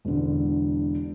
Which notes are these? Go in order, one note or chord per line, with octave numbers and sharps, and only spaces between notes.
E1 D3